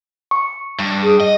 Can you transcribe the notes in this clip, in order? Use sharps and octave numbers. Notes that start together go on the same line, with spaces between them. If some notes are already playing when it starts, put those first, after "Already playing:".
C#6
G2
G#4
D#5